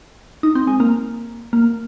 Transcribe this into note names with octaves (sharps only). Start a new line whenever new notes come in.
D#4
C4
G#3
A#3
A#3